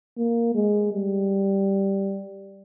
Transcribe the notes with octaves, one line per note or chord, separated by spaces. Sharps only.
A#3
G#3
G3